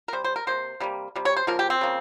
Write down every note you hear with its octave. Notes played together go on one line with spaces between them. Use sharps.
A#4
C3 G3 C5
C5
A#4
C3 G3 A#3 C5
C3 G3 A#3
C3 G3
C#5
C5
C#3 F3 A#3 A#4
G4
C4
C#3 F3 A#3